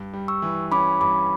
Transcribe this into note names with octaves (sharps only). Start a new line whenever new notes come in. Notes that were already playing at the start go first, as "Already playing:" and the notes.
Already playing: G2
G3
C#6 E6
E3
C#4 B5 D6
G2 B5 D6